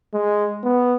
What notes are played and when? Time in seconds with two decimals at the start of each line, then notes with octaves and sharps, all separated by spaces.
0.14 G#3
0.64 B3